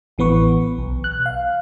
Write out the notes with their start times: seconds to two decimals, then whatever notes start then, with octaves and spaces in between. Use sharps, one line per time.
0.18 A1 E3 B3 B4 C#6
0.78 B1
1.04 F#6
1.26 F5